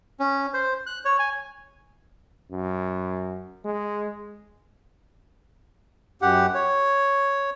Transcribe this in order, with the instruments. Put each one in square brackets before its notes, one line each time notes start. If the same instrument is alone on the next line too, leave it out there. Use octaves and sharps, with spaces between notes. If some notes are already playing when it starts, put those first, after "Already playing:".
[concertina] C#4
C5
F#6
C#5
G#5
[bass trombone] F#2
G#3
[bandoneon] F#2 G4 F#5
C#5